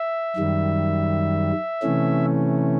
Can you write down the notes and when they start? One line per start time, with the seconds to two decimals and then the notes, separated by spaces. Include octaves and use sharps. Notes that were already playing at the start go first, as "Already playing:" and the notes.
Already playing: E5
0.36 F#2 D#3 G3
1.82 C3 E3 A3 C#4